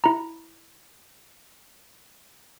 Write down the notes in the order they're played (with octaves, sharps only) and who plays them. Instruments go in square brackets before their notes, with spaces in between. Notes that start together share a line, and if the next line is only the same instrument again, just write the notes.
[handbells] E4 A#5